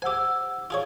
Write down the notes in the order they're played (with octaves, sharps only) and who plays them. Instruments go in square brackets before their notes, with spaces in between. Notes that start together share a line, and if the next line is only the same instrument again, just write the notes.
[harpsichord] G4 G#5 [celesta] C5 F#5 E6
[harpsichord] F4 G#4 C#5